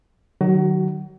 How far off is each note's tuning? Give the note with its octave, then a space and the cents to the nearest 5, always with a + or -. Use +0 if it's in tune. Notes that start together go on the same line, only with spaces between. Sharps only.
D#3 -35 F#3 +0 F#4 +30